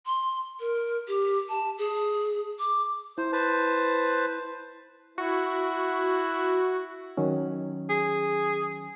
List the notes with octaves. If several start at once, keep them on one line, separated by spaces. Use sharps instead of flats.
C6
A#4
G4
A5
G#4
D6
E4 C5
B4 C5 A5
E4 F#4
D#3 F#3 C#4
G#4